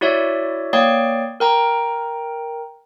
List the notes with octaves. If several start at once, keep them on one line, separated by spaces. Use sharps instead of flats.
E4 F#4 C#5 D5 E5
A#3 C#5 D5 G5 C7
A#4 G5 A#5